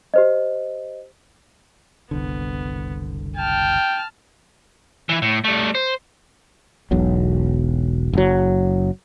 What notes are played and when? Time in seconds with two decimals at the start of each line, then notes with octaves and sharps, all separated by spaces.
0.14 G4 C5 D#5
2.11 F#1 C2 D3 B3
3.36 G5 A5 F6
5.09 E3 E4
5.22 A2
5.44 G3 A3
5.75 C5
6.91 E1 B1 F#3
8.13 F#1 F#3